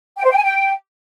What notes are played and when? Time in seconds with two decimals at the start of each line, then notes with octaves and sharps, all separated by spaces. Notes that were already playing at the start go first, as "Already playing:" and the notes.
0.18 G5
0.24 C5
0.30 G5
0.37 G#5
0.43 G5